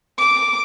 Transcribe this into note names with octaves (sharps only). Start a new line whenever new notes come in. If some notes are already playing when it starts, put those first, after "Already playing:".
D6